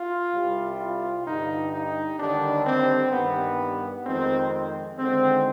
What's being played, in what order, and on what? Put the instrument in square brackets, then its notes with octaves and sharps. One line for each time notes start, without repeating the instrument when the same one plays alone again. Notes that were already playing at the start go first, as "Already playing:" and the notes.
Already playing: [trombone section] F4
C2 C3 G3
F4
G2 D3 G3 D#4
D#4
D#2 D3 G3 D4
C4
G2 D#3 G3 B3
F2 D#3 G#3 C4
D#2 D3 G#3 C4